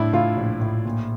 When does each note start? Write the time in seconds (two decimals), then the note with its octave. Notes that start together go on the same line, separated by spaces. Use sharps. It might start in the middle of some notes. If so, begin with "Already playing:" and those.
Already playing: A2 D4 E4
0.13 A2 F4
0.37 A#1
0.61 A2
0.85 A#2